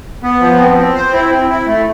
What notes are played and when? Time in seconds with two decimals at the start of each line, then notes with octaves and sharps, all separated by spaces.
0.23 B3
0.41 F3
0.59 C4
0.77 C4
0.95 C5
1.13 E4
1.31 C4
1.49 E4
1.67 A3